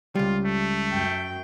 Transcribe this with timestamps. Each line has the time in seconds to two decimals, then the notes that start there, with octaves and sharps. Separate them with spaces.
0.15 C#2 G3 F4
0.44 A3
0.92 F#2 G5